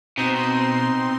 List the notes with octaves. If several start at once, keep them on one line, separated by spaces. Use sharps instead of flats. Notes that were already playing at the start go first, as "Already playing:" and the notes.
B2 C4 D#4 C6